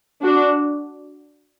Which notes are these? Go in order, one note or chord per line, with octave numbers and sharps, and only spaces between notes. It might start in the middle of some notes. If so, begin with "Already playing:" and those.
D4 F#4